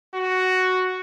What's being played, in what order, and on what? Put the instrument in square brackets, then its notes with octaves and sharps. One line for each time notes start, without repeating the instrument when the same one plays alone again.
[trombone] F#4